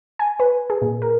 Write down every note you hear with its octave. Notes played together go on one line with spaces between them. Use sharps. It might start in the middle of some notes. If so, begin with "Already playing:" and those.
G#5
B4
G#4
A#2
A#4